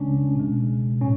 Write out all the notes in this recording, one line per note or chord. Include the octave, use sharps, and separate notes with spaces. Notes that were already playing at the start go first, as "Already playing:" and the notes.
Already playing: C#3 G#3 C#4 D4
B2 G#3
A2 C#4